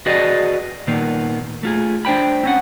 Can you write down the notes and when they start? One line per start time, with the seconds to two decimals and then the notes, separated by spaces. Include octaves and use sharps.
0.06 F#4 G#4 B4 D5 D#5
0.87 A#2 D#3 A#3 B3
1.63 A3 F4 G#4
2.05 D4 C5 G5 B5
2.44 C4 C#4 F#5